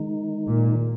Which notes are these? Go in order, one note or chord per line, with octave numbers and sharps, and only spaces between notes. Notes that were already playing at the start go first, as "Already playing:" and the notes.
Already playing: D#3 G#3 D#4
A#2